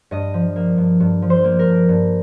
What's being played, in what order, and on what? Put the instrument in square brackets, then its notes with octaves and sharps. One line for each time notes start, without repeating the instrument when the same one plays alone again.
[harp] G2 D#5
F3
A#3
G2
G2
F3
C5
A#3
A#4
G2
G2